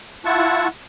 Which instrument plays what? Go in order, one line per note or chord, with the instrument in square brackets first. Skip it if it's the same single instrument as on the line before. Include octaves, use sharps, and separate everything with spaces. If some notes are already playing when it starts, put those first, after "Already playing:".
[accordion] E4 F4 F#5 A5 C#6